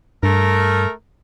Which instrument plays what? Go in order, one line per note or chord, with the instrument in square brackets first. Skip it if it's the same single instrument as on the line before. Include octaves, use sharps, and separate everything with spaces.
[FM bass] G2 [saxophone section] A3 A#4